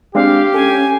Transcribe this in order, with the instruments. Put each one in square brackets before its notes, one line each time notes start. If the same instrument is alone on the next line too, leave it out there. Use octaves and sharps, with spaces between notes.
[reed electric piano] G#3 C4 D4 [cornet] G4 [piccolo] F5
[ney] C#4 [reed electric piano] A4 [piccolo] G#5